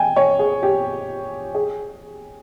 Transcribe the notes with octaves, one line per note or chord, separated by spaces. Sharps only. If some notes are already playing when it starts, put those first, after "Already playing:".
Already playing: G5 G#5
C#5
G#4
G4
G#4